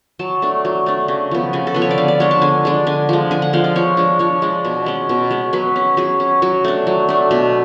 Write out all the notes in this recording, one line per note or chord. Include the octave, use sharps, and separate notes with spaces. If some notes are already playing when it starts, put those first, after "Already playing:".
F#3 A5
A3 D4
F#3
A3 D4
C#3
F3 B3
C#3 G#5
A4
F3 B3 B4
C#5
D5
D3 F5
D5
G#3 D4 C#5
A5
D3 G#5
G#3 D4
D3 G#5
F3 G#3
D3 G#5
F#5
F3 G#3 F5
D5
F3 C#5
G#3 D4
F3 C#5
G#3 D4
B2
G#3 C#4
B2
G#3 C#4
F#3 B4
C#4
F#3 G#4
C#4
F#3 F#4
A3 D4
F#3
A3 D4
B2 B4